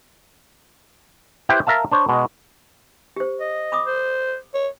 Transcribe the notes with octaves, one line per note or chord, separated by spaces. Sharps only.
E4 G4 B4 C5 E5 G5
A#4 E5 F5 A5
D4 C5 C#5
B2 G#3 D#5
G4 C5
D#5
B5 D6 D#6
C5
C#5